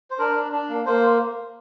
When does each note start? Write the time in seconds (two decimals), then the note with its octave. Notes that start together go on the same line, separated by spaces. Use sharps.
0.11 C5
0.18 D4 A#4
0.36 D4
0.52 D4
0.69 A#3
0.86 A#3 C5